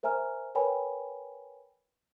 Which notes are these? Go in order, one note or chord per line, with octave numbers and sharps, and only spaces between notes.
A#4 C5 E5 G#5 A#5 F6
A#4 B4 C#5 G5 G#5 B5